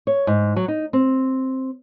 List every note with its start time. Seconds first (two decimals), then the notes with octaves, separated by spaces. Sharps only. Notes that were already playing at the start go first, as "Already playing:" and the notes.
0.07 C#5
0.27 G#2
0.56 F#3
0.68 D#4
0.93 C4